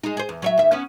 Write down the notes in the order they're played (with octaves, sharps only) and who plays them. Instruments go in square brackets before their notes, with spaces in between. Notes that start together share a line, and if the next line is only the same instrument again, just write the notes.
[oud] G#3 D#4
G#4 C5
E2
F#3 C#5 E5
D#2 E5
B3 C#4